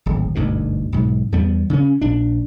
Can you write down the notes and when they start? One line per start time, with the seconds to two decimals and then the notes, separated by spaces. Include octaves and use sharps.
0.06 D1 G#1
0.35 G1 D2 G#2 B2
0.92 B1 G#2
1.32 E2 G3 B3
1.70 C#3 C#4
2.02 A#1 D4